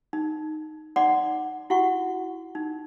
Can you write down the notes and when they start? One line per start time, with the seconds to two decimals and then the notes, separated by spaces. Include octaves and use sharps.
0.13 D#4
0.96 D#4 D5 F#5 C6 D6
1.70 E4 F#4 F#5 C#6
2.55 D#4